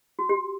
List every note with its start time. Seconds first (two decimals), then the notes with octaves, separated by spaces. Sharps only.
0.19 F#4
0.29 G4